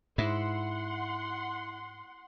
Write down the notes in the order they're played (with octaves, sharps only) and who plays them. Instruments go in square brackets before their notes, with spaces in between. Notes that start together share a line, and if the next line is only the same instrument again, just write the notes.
[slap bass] G#2 [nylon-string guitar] E4 [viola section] F#5 C6